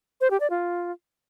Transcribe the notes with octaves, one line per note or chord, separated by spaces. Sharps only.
C5
G4
D5
F4